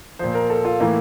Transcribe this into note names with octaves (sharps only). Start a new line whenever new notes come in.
A#2 F3 C5
A#4
A4
F4
A2 E3 A#3